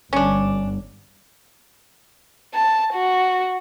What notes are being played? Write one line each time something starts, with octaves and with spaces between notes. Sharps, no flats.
G1 C#4 D4
A5
F#4